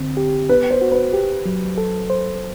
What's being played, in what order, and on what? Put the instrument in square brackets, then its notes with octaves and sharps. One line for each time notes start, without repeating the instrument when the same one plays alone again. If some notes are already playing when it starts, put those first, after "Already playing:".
Already playing: [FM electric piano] D3 C4
G4
[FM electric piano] B3 [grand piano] B4
[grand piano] C5
[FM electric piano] F#4
[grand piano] B4
[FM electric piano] G4
F#3
A4
C5